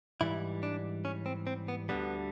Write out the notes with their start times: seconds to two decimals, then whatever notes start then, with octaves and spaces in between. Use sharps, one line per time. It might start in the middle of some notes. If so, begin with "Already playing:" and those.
0.21 G#2 E3 G3 E4
0.63 D4
1.05 C#4
1.26 C4
1.47 C4
1.68 B3
1.89 D2 D3 G3 B3